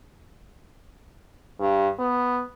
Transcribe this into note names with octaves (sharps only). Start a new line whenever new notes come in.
G2
B3